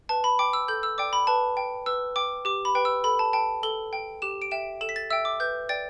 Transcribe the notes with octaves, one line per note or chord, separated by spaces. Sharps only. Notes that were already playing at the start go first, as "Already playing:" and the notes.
B4 A5
B5
G5 D6
E6
A4 G6
E6
D5 G5 D6
B5
B4 A5
G5
B4 E6
G5 D6
G4 D6
B5
B4 G5
E6
A4 B5
A5
G5 A5
A4 G7
G5
G4 E7
D7
E5 G5 E7
A4 E7
B6
A6
E5 G5 E6
D6
B4 G6
D5 G5 A6